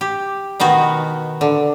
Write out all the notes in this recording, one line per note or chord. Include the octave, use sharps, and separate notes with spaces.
G4
B2 D#3 B3 F#4
D3